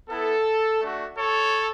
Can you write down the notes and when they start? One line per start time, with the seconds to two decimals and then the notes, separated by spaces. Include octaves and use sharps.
0.09 B3 E4 A4
0.81 A3 D4 F#4
1.18 A4 C#5